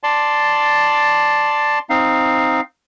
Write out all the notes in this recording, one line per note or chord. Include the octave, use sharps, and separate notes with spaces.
D5 A5 C6
C4 D#4 F5